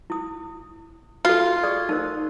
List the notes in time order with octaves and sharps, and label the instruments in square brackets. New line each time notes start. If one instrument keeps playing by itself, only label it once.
[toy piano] E4 D#6
[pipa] F4 [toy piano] F#4 A4
[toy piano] G#4 D5 D#6
D#4 A#4 C5